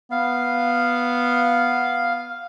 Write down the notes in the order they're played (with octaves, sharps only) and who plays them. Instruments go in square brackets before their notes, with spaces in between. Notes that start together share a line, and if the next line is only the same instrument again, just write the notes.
[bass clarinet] B3 [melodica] F5